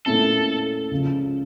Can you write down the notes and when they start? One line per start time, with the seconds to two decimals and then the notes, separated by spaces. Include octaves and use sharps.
0.06 A#2 A3 C#4 E4 A4
0.91 C#2 C#3 F3